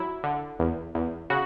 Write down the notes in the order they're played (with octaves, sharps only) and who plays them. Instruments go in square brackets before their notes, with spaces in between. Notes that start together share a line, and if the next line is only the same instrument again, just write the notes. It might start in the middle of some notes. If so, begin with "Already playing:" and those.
Already playing: [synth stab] F#3 E4
D3
E2
E2
C#3 F#4